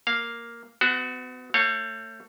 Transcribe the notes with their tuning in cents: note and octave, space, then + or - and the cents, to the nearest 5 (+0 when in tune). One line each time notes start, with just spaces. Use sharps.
A#3 +0 F5 +0
B3 +40 F#4 +0
A3 +30 C#5 -15 F5 +0